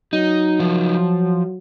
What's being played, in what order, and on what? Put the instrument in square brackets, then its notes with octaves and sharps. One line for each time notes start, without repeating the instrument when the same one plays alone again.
[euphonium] F#3 [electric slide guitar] D#4
[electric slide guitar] F3